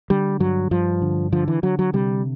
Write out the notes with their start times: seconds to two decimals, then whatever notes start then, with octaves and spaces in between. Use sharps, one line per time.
0.10 D3 G3
0.40 G2 F#3
0.71 G2 F3
1.02 D3
1.32 D3 F3
1.48 E3
1.63 D3 F#3
1.79 F#3
1.93 C3 G3